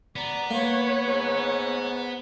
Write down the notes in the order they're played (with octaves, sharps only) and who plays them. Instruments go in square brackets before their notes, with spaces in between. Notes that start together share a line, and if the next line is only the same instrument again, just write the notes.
[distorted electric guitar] B3 [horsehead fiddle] D5 A#5
[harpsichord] A#3 [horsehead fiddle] B4 C#5
[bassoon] G#2